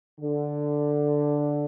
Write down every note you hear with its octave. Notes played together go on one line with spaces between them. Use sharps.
D3